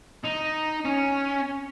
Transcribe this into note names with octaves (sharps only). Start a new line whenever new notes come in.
D#4
C#4